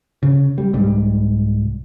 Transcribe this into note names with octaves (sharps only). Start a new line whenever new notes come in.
C#3
G3
C2 G#2 G3